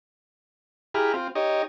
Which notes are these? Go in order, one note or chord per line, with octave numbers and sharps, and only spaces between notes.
E4 G4 G#4 A#5 B5 F6
C4 F4
D#4 G4 C#5 D#5